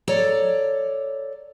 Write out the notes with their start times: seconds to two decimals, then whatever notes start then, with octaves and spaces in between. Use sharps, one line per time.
0.08 A4 C#5 D5 A#5